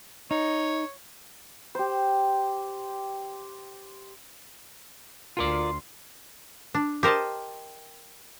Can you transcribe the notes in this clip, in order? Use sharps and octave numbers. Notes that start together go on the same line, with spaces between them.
D#4 C#5
G4 C5
D2 F4 A#4 D5 C6
D4
G4 A#4 C5 D#5 A5